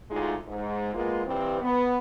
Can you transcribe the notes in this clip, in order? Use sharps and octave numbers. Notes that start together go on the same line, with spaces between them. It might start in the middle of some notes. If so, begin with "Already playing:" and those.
D2 G#3 D#4 F4
G#2
G#3 A#3 B3 F4
G2 E3 C4
B3